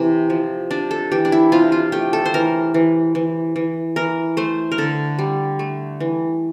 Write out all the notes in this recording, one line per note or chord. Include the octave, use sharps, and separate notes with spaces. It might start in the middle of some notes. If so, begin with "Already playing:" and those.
Already playing: C3 E3
F3
C3 D4
A4
E3 G4
D4
E4
C3 F4
F4
A3 G4
A4
C5
E3 A#4
E3
E3
E3
E3 A#4
A3 C5
A#4
D3 A4
G3
A3
E3